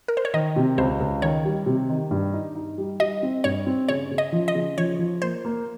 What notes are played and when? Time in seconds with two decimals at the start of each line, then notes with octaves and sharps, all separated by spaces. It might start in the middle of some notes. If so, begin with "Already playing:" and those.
0.08 A#4
0.17 C5
0.25 C#5
0.34 D#3 D#5
0.56 C3
0.78 C#2 C5
1.00 C#2
1.22 D#3 C#5
1.45 G3
1.66 C3
1.89 D#3
2.11 G2
2.33 D#4
2.56 D#4
2.78 G3
3.00 G3 D#5
3.23 C4
3.44 G2 C#5
3.66 C4
3.88 C#3 C#5
4.11 C#3
4.18 D#5
4.32 F3
4.48 D#5
4.55 C#3
4.78 F3 C#5
4.99 F3
5.22 A#3 C5
5.45 A#3